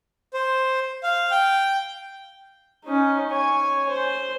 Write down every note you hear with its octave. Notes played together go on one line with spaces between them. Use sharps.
C5
F5
G5
C#4 D#4
C#5 G#5
C5